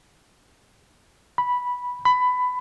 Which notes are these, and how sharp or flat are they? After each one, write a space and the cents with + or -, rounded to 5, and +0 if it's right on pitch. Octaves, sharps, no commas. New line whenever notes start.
B5 -10
B5 +15